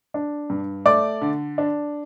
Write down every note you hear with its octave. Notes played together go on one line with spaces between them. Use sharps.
D4
G2
A3 D5 D6
D3
D4